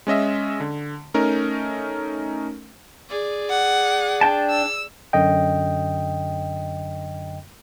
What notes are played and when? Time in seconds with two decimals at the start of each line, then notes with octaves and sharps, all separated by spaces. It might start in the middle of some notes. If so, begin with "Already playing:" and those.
0.07 G#3 C#4 D#5 E5
0.60 D3
1.14 A3 C#4 D#4 A#4
3.09 G#4 D5
3.50 F#5
4.21 D4 G5 A5
4.50 E6
5.13 F#2 D3 D#5 G5